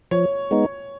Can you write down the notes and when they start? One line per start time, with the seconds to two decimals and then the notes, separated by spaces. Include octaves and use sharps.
0.11 F3 C#5
0.51 G#3 B3 D#4